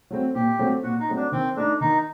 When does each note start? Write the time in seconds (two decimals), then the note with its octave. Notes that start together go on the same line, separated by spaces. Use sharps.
0.11 F#3 A3 C4
0.35 A#2 G4
0.59 F#3 A3 C4
0.83 A#2 F#4
1.00 D#4
1.08 F#3 A3 C4
1.16 D4
1.32 D#3 C4
1.56 A3 D4 D#4
1.81 D#3 D#4